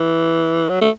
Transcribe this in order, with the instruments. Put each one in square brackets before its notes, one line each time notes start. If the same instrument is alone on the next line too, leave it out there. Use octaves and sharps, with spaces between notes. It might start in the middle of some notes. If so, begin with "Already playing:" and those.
Already playing: [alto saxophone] E3
F#3
A3